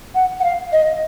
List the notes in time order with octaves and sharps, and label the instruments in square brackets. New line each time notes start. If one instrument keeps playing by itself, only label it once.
[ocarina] F#5
F#5
F5
D#5